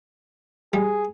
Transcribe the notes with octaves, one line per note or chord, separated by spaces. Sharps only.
G3 G#4